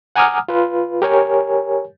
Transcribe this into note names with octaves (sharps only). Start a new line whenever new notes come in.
F#5 G#5 A#5 D6 D#6 F6
F4 B4
G4 A#4 C#5 G#5